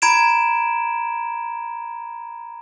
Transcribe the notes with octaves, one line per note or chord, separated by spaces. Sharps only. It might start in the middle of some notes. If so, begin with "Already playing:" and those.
A#5 B5 G#6 D7 E7